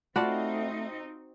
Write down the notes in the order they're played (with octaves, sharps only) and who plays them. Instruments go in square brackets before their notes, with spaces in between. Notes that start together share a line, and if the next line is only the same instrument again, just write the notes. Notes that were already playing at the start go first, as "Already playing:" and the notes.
[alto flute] A3 [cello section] C4 D#4 [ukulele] F4 A5 B5 [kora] F#4 D5